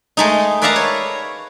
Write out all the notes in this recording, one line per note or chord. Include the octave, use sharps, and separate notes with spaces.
G#3 A3 D#4
B4 D5 E5 F5 A5 A#5
C#5